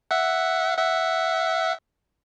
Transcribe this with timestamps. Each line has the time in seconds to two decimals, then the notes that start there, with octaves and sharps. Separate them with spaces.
0.11 E5 F#5
0.78 E5 F#5